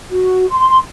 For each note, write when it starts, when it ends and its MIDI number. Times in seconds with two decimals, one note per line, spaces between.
0.11 0.47 66
0.51 0.78 84